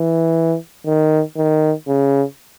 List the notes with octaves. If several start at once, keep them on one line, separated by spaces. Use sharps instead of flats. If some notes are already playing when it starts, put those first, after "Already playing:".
Already playing: E3
D#3
D#3
C#3